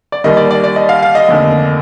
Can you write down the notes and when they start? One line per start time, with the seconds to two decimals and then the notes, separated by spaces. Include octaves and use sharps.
0.12 D5
0.24 D#2 D#3 G3 D#5
0.37 D5
0.51 D5
0.64 D5
0.76 D#5
0.89 F5
1.02 F5
1.15 D#5
1.28 F1 D#2 D3